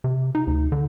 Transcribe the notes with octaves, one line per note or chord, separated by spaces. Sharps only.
C3
D#4
D2
D3